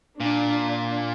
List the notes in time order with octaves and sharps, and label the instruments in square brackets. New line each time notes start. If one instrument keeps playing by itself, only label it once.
[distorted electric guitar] A#2 [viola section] D4